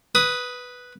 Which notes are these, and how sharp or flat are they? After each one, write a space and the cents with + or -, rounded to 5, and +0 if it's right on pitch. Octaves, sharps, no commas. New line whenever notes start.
B4 +0 D#6 +10